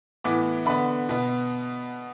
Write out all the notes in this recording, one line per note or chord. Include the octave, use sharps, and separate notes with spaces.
A2 E3 B3 D6
D3 B3 B5
B2 B3